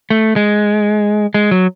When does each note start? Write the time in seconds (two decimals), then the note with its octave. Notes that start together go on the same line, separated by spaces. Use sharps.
0.10 A3
0.36 G#3
1.34 G#3
1.51 F#3